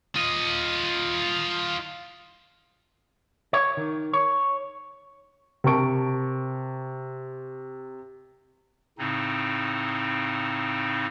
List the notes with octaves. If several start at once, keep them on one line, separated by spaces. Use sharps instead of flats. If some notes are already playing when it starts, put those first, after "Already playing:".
F4 D#5
C#5
D#3
C#5
C3 A#4 A5 C#6 D7
A2 C#3 C4 D#4